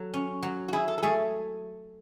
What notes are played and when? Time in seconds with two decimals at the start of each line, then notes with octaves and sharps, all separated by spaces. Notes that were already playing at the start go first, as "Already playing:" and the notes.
Already playing: F#3 A4
0.14 C#4
0.42 F#3
0.68 F#4
0.73 E4 G#4
0.88 A4
0.98 A4
1.03 A3 G#4